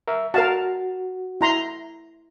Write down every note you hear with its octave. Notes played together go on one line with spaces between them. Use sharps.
A#4 E5
F#4 A#4 F5 A5
E4 A#5 C6